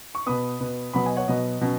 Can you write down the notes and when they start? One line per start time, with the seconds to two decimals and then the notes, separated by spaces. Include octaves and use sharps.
0.15 C#6
0.26 B2 B3 B5 D#6
0.61 B2 B3
0.94 B2 F#3 B3 F#5 B5
1.05 D#5 G#5
1.16 C#5 F#5
1.28 B2 F#3 B3 D#5
1.61 B2 F#3 C#4